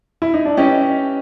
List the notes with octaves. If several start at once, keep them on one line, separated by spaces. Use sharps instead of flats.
E4
D#4
D4
C#4 E4 G4 B4 D#5